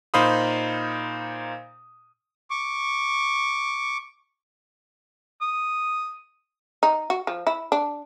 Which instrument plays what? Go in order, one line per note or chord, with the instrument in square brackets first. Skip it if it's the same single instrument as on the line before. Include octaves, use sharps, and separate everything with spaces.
[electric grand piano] A#2 D#4 C5 F5 B5 D#6
[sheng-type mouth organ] C#6 D6
[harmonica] D#6
[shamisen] D#4
F#4
F3
E4
D4